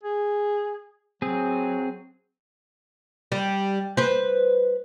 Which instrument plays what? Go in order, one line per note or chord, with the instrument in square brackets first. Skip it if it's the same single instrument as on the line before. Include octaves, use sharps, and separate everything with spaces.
[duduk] G#4
[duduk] F#3 [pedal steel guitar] C4 G#4
[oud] G3
B4 C5